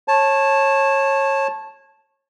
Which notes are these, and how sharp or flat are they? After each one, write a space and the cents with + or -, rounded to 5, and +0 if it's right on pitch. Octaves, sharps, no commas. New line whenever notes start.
C#5 -25 A5 -5